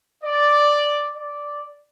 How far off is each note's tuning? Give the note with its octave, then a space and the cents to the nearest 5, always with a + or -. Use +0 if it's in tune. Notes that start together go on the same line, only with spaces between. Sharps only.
D5 +0
D5 -5